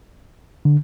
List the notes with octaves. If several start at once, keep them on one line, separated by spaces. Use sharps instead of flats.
D3